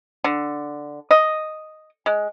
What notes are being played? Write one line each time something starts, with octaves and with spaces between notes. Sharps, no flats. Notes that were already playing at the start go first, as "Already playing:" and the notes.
D3
D#5
G#3